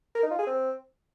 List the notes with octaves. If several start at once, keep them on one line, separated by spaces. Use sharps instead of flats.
A#4
D#4
F4
G#4
C4